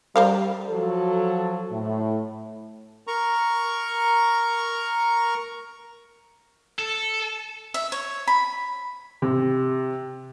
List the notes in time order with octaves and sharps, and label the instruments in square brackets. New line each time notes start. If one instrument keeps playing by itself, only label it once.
[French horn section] G3 [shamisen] A#3 C5 F5
[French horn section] F3 F#3 A4
A2
[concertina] A#4 A#5 C#6
[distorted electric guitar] A4
[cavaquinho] E5
C#5
B5
[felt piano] C3